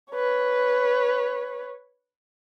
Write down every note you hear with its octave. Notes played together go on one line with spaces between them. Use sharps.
B4 C#5